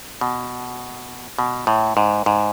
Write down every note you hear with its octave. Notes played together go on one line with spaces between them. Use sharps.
B2
B2
A2
G#2
G#2